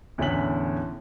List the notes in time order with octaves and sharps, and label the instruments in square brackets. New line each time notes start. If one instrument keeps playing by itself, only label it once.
[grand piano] E2 A2 D3 C#4 B6 F#7